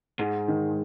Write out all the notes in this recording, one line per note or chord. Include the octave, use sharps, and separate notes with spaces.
G#2 G#3
D#3